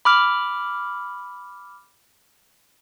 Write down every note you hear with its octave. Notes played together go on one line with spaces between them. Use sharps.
B5 D6 F6